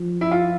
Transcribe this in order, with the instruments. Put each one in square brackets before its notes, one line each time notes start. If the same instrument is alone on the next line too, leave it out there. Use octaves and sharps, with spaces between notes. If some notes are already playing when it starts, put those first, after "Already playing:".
Already playing: [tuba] F3
[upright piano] E4
F4